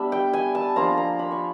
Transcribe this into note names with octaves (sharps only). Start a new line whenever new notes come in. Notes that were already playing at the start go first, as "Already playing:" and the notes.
Already playing: G3 B3 D4 E5
G5
G#5
A5
F3 A#3 D4 F4 A#5
A#5
B5
C#6